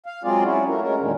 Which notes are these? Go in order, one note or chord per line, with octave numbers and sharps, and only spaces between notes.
F5
F#3 G#3 C4 F4 G#4 D5
C#4 E4 F#4
A3 A#4
G#3 C#4 A#4
E2 A#2 D3 D#3 G#3